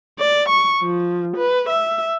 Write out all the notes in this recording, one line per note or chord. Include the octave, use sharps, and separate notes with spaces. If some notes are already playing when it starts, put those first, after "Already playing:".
D5
C#6
F3
B4
E5